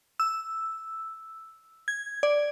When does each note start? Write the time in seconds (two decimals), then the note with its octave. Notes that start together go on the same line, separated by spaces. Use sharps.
0.20 E6
1.88 G#6
2.23 D5